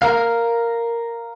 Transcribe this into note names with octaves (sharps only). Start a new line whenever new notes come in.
A#4 F5